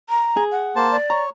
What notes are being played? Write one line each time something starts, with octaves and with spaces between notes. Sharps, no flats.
A#5
G#4
F#5
A#3 C5 A5
D5
C#5 A#5